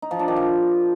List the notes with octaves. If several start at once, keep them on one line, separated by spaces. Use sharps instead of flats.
D#4
F3
D4
D#3
F3